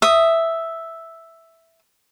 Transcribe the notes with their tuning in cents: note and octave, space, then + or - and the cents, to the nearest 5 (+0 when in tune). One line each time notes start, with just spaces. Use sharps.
E5 +0 D#6 +0